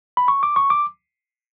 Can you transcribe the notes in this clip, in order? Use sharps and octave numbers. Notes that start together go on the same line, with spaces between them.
B5
C#6
D6
C#6
D6